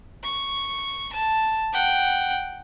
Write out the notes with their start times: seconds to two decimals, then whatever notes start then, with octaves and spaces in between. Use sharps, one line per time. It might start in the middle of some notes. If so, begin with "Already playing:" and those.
0.23 C#6
1.13 A5
1.73 F#5 G5